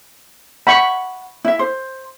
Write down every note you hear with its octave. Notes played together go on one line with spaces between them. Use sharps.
F#5 B5 C#6
E4 E5
C5